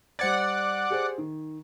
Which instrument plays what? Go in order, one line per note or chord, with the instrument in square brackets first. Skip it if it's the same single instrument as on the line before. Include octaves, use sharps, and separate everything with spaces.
[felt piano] G3 C5 G#6 [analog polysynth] D5 F#5
[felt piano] G4 G#4 C5
D#3